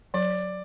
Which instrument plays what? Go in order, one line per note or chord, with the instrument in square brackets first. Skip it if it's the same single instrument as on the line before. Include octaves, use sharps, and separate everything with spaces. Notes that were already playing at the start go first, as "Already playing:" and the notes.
[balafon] F#3 [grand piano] D5